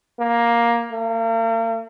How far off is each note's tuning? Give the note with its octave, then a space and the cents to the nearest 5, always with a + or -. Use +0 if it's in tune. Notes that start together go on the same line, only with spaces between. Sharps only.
A#3 +10
A#3 -40